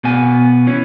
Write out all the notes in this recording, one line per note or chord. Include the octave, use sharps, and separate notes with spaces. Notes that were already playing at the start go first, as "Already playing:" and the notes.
B2 B3 G#5
E3 C#4